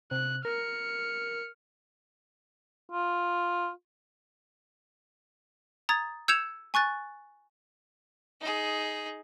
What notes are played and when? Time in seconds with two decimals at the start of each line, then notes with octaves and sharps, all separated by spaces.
0.11 C3 F#6
0.45 A#4 F6 C#7
2.92 F4
5.89 A#5 D#6 G#6 A6
6.28 E6 G6 G#6 C#7 E7 F7
6.74 G#5 C#6 F#6 A6
8.41 D#4 G#4